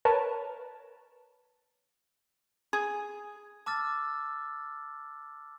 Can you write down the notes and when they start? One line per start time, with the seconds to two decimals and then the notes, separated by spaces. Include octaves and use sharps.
0.05 A#4 B4 C#5 A5
2.73 G#4
3.66 A5 D6 E6 F6 A6